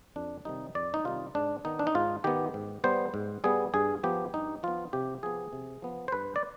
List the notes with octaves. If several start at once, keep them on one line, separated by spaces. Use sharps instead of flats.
F2 D4
C3 D#3 G3 D#4
F2 D5
D#4
C3 D#3 G3 F4
G#2 D4
D#3 B3 D#4
D4
D#4
G#2 F4
D#3 B3 G4
G#2
G3 B3 C5
G#2
G3 B3 G#4
G2 G#4
F3 B3 G4
G2 D#4
F3 B3 F4
C3 G4
F3 B3 G#4
C3
F3 B3
C5
G2 B4
D5